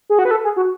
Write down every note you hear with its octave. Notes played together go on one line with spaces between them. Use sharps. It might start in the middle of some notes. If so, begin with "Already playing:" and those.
G#4
F#4
B4
A4
G#4
F#4